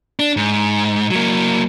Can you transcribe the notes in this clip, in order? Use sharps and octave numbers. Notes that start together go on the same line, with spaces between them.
D4
G#2
F#3 A#3